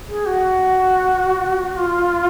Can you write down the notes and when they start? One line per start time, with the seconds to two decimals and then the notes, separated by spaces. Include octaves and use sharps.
0.09 G#4
0.26 F#4
1.76 F4